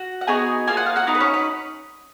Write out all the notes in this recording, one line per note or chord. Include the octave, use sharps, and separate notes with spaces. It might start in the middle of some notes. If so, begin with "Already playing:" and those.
Already playing: F#4
F#5
B3 D#4 F#4 G#4 G#5
A#3 F4 G#4 G#5
F#5
F5
F#4 F#5
B3 D#4 F#4
B4
C#4 C#5
B4